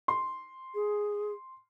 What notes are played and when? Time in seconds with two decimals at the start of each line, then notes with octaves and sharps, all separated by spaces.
0.08 C6
0.75 G#4